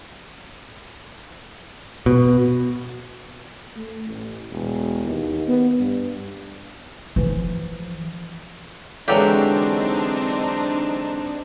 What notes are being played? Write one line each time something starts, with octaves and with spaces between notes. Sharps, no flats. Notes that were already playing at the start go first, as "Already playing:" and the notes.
B2
A3
A1
E1
D#2
B3
G2
E3 F3
D3 E3 F#3 G#3 C4 D4 D#4 G4